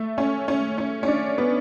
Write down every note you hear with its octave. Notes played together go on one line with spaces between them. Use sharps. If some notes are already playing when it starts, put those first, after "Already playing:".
Already playing: A3
C#4
C#4
C#4
C#4
D4
B3